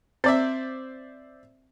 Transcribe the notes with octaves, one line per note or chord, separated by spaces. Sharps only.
C4 C5 D5 E5